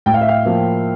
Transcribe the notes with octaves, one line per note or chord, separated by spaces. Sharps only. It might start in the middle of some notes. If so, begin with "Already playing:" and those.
A2 G5
F5
E5
F5
F3 A#3